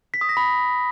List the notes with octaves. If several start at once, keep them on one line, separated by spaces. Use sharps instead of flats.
B6
D#6
A#6
B5